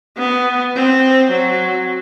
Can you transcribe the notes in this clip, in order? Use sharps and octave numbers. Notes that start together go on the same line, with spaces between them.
B3
C4
F#3